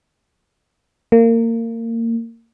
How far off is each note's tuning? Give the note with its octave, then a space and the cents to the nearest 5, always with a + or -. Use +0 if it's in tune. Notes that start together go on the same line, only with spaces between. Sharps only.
A#3 -25